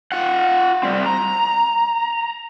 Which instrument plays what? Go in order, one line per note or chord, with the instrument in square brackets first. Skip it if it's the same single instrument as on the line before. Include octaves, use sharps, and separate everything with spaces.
[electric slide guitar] F4 F#5
G3 C4
A#5